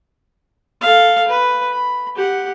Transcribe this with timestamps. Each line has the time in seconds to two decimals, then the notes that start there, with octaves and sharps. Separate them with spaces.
0.81 A4 F5
1.28 B4
1.71 B5
2.16 G4 F#5